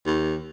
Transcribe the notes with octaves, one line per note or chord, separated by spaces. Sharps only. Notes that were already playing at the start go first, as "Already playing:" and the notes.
D#2